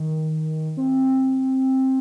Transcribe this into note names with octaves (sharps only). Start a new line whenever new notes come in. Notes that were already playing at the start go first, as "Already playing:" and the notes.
Already playing: D#3
C4